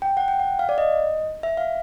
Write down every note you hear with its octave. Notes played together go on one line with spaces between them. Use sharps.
G5
F#5
G5
F#5
F5
D5
D#5
E5
F5